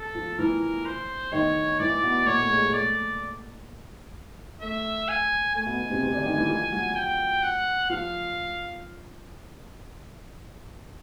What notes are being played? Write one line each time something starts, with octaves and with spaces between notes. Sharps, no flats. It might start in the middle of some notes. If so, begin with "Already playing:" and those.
Already playing: A4
F3 F4
E3 E4 A#4
C5
D#3 D#4 C#5
E3 E4 D5
B2 B3
A#2 A#3 C#5
A3
G#3
G#3
A3 D5
A3 E5
G#5
A3 G#5
B2 B3
B2 B3
C3 C4
C3 C4
D3 D4
D#3 D#4
E3 E4
F3 F4
F#3 F#4
G5
F#5
F3 F4 F5